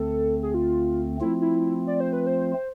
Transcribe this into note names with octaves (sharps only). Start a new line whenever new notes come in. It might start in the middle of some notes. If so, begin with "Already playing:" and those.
Already playing: D2 D3 A3 C4 A4
G#4
F4
F3 A3 C4 E4 F4
E4
D5
C5
B4
C5